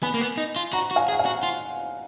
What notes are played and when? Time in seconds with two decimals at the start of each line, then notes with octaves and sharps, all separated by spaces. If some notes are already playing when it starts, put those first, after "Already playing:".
0.03 B3 G#5 B5
0.14 A#3
0.21 B3
0.37 D#4
0.56 F4
0.73 F#4 F#5 A#5
0.91 F#4
0.96 F5 G#5
1.08 G#4
1.13 F#5
1.19 F5 G#5
1.25 F#4
1.43 F4